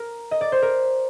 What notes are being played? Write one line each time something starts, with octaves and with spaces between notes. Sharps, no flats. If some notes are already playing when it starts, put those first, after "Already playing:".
Already playing: A#4
D#5
D5
C5
A#4